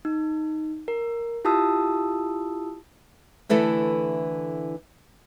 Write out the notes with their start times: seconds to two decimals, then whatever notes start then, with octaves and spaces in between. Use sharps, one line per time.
0.05 D#4
0.88 A#4
1.45 E4 F4 G4 A5 D#6 E6
3.49 D3 E3 A3 E4 A4